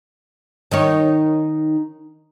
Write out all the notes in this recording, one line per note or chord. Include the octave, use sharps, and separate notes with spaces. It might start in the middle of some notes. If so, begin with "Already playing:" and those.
D#3 D#4 C#5